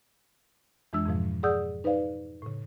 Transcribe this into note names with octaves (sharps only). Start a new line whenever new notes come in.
F2 E3 G#3 D4 E6
F2 G#2 B2 F3
G#4 D5 F#5 D#6 E6 G6
D#4 B4 C5 D5 F5
A2 C#3